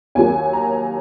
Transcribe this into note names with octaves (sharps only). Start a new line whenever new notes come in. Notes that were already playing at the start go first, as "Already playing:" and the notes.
D#2 D#3 F#3 G#5
A#5